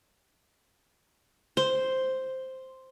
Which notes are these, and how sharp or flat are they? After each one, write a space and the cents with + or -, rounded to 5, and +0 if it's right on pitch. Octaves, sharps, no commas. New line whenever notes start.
C5 +0